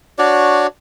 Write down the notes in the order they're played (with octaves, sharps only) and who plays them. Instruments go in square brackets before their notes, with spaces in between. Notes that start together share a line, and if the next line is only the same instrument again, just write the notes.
[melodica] D4 F#4 C#5 D5